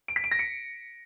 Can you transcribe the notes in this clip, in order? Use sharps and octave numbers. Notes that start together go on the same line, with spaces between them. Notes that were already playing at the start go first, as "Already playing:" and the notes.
D7
B6
D7
A#6
C#7